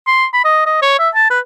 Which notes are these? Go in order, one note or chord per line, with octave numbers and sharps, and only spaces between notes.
C6
B5
D#5
D#5
C#5
E5
A5
B4